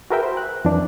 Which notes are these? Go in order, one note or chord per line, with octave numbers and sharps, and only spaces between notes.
F#4 G#4 A#4 B4 E5 G5
C5
F#6
F2 E3 D4